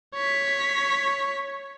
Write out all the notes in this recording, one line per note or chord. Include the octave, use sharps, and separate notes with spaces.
C#5 B6